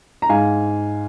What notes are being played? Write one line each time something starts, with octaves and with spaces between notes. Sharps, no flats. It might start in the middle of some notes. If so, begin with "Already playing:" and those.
A#5
G#2 F5 G#5